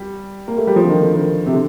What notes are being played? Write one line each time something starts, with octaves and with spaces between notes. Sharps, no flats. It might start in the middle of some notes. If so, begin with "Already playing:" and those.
Already playing: G3
A#3
A3
G3
F3
D3
D#3
D3
D#3
C3
D3